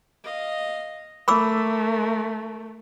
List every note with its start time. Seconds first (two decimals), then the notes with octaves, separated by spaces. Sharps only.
0.24 D#5 F5
1.28 A3 A#4 B5 D6 E6